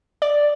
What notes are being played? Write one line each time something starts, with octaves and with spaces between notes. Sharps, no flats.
D5